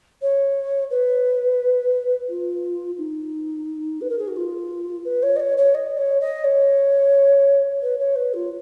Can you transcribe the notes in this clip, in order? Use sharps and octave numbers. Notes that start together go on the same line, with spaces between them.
C#5
B4
F4
D#4
B4
A#4
G#4
F#4
F4
B4
C#5
D#5
C#5
C#5
D#5
C#5
D#5
C#5
B4
C#5
B4
F4